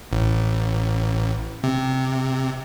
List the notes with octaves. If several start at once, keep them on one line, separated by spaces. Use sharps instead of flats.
A1
C3